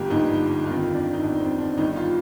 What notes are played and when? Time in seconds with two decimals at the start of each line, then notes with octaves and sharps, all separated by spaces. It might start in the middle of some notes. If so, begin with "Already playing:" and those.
Already playing: G1 G2 D3 F3 A#3 G4
0.10 G1 G2 D3 F3 D#4
0.66 G1 F2 D#3 F4
0.94 D4
1.13 D#4
1.22 G1 F2 D#3 D4
1.40 C4
1.59 D4
1.77 G1 G2 D#3 D#4
1.96 F4